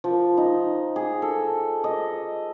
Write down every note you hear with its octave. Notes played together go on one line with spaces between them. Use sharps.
F3
D#4
G#4
A4
D#5